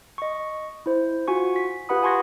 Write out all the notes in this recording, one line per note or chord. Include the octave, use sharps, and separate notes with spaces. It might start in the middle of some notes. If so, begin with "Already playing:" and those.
D#5 C#6
E4 C5
F4 F#4 G#5 C#6
B6
F4 G4 B4 F#5 B5 D#6
G#5 A5 C6 C#6 G#6 A#6